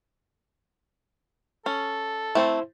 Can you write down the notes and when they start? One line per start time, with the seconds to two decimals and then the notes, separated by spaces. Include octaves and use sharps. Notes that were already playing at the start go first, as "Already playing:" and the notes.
1.66 C#4 A4
2.35 A3 C4 E4 C5